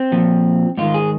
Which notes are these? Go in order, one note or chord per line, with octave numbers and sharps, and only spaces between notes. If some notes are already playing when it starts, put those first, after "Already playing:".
Already playing: C4
A#2 F3
G#2 D#3 F4
G#4